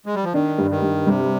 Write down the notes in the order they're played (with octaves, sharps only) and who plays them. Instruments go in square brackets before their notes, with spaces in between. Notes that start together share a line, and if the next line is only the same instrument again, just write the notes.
[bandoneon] G#3
G3
F3
[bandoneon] D#3 [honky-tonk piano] D4
[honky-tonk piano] G2
[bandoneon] D#3
[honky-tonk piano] G2
[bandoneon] C3 [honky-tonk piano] G3